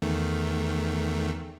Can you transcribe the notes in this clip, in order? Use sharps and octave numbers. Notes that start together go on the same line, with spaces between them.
E2 D#3 A3